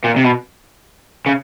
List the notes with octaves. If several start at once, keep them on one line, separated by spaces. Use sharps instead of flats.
A#2
C3
B2
C#3